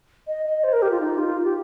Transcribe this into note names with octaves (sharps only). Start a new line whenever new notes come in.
D#5
D#5
C5
A#4
G4
F4
D#4
F4
G4